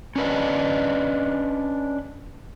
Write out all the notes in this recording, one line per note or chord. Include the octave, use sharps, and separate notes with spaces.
C#4 D4 B4 D#5